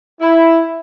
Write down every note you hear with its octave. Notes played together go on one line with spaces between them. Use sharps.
E4